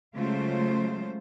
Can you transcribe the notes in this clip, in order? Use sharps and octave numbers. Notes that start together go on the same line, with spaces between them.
C#3 F#3 G#3 A3 F4 C5